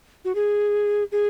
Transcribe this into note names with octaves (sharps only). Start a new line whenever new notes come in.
F#4
G#4
G#4